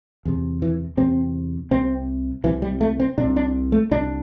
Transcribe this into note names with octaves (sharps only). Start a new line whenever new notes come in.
E2 C3
E3
E2 C3 C4
C2 C3 C4
C2 C3 E3
G3
A3
C4
C2 C3 D4
D4
A3
C2 C3 D4